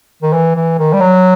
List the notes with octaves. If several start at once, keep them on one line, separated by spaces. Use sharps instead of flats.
D#3
E3
E3
D#3
G3
F#3